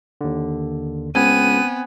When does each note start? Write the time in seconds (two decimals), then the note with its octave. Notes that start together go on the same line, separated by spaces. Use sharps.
0.21 D#2 D3
1.15 C#2 B3 C4 G#5 D#7